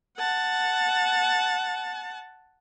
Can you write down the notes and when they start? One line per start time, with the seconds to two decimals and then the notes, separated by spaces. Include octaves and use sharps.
0.17 F#5 A5